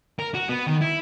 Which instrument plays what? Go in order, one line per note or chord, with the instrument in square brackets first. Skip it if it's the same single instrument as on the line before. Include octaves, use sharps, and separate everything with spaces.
[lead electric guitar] A#4
F#4
B3
D#3
E4